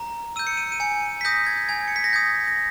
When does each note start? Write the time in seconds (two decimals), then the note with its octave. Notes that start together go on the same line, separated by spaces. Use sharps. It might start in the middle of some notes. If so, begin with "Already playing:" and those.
Already playing: A#5
0.36 E6 G6 D#7
0.47 C#7
0.57 D#7
0.72 D#7
0.80 G#5 C#7
1.21 B6
1.25 D#6 G6 A#6
1.46 G#6
1.69 G#5 G#6
1.88 C#7
1.96 B6
2.04 A#6
2.13 D#6 G6 G#6
2.48 A#6